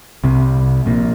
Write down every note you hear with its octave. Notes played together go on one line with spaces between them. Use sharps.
C2 C3
A#1 A#2